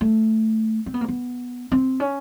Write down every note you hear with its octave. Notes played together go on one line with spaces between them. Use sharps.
A3
C4
B3
A#3
B3
C4
C#4